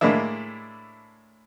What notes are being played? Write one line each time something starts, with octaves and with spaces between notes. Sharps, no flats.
A2 G#3 A#3 D4 E4